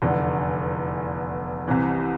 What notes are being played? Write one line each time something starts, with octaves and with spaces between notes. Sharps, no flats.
F1 E2 D3
C2 C3 E3